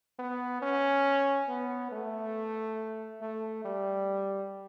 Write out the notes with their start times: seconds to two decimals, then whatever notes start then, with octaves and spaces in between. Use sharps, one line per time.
0.19 B3
0.62 C#4
1.48 B3
1.92 A3
3.22 A3
3.65 G3